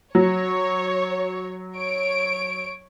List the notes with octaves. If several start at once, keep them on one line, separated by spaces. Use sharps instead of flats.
F#3 C#5
C#5 D7